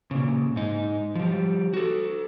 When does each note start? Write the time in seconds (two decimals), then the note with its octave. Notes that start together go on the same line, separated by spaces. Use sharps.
0.11 A#2 C#3
0.56 G#2 D#4
1.15 F3 G3
1.74 F#4 A4